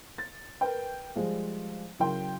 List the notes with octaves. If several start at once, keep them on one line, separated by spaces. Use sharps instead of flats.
A6
A#4 B4 G5
F3 G3 G#3
C#3 F#3 E4 A#4 G5 C6